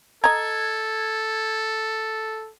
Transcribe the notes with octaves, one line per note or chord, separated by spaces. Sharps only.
A4 D#5 A#5 G#6